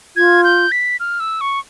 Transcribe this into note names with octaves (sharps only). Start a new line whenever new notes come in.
F4 G#6
G6
B6
F6
E6
C#6